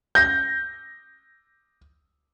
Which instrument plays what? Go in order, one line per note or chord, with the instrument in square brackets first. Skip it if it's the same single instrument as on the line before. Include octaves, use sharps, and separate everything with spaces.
[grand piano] G6 A#6